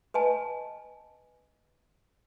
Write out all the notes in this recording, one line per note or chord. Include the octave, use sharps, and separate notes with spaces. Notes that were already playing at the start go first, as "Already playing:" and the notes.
B4 D#5 G#5 A5